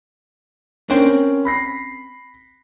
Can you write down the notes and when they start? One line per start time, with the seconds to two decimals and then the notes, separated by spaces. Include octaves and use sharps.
0.90 C#4 D4 A#4 C5 G5
1.06 C4
1.45 B5 A#6 C7